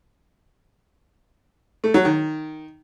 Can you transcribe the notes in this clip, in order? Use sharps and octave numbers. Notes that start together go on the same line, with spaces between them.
A3
F#3
D#3